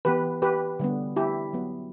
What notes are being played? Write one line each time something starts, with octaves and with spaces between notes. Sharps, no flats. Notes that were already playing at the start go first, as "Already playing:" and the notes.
E3 B3 G4 B4
G4 B4
D3 G3 B3
E4 G4
F#3 B3